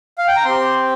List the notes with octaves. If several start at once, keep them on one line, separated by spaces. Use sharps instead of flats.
F5
G5
A#5
C4 G4 C6